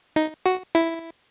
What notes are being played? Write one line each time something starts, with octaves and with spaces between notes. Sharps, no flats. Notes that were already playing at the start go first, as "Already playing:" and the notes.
D#4
F#4
E4